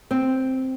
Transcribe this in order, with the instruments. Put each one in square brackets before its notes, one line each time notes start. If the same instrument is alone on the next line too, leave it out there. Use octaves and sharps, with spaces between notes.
[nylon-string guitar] C4